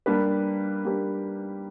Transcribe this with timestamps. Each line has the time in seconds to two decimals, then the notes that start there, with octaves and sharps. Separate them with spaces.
0.06 G3 A#3 D4 G4 B4
0.85 G3 A#3 D4 G4 B4